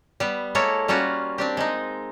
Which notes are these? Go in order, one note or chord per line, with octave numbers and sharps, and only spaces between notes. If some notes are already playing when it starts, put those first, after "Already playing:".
G3 B3
G#3 A#3 E4 A4 A#4 C#5
G3 A#3 C#4 F4 F#4
C4 D4 G4
G#3 D#4